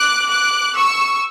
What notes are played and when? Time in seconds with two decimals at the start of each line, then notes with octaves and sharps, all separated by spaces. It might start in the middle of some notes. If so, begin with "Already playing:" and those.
Already playing: D6 F#6
0.30 D6 F#6
0.76 C#6 E6